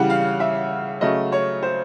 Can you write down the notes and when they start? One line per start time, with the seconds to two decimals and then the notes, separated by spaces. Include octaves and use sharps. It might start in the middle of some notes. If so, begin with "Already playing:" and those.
Already playing: C#3 E3 G3 F#5
0.10 F5
0.40 E5
1.01 C#3 F#3 A3 D#5
1.32 C#5
1.63 C5